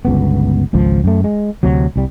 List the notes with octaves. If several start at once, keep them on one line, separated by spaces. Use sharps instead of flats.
G1 C#2 B3
G#1 C#2 F3
F#2 A3
G#3
D2 C3 F#3
C2 G3